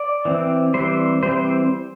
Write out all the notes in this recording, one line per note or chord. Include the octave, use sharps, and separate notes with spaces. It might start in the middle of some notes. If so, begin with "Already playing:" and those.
Already playing: D5
E3 C4
E3 G3 C4 C5
E3 G3 C4 C5